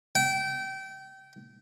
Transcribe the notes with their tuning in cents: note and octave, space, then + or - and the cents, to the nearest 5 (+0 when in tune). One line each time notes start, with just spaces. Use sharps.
G5 -25